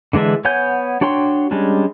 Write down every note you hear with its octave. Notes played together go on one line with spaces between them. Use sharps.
D3 E3 G#3 D4 E5
B3 C#5 F#5 G#5 G6
D4 F#4 C#5 G5 C6
G3 G#3 C#4 D4